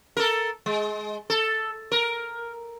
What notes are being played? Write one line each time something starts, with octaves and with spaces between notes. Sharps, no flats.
A4 A#4
G#3
A4
A#4